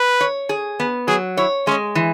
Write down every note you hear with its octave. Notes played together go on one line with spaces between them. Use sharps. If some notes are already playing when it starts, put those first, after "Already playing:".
Already playing: B4
C#5
G#4
B3
F#3 G#4
E4 C#5
G#3 C#4
E3